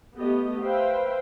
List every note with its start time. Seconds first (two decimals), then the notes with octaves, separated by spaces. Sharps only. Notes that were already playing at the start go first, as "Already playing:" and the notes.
0.16 A3 B3 G4 D#5
0.63 B4 C5 E5 F5 G5